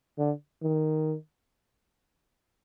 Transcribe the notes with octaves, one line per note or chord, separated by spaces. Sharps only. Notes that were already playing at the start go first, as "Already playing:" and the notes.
D3
D#3